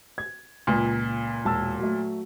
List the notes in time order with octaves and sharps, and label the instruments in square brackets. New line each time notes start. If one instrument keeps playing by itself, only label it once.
[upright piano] G#6
[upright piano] C#2 [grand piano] A#2
[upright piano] E1 A5 E6
F#3 A3